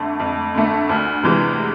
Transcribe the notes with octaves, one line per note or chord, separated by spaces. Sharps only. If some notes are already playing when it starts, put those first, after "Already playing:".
Already playing: F2 D3 A3
F2
D3 A3
D2
C3 E3 G#3